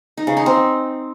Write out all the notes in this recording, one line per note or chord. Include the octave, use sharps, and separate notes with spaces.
D#4
C#3
D#4
C4